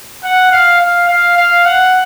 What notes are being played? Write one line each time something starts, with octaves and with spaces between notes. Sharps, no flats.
F#5
F5
F5
F5
F5
F#5